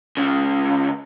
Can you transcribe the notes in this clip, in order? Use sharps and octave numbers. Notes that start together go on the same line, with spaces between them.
C#2 C#3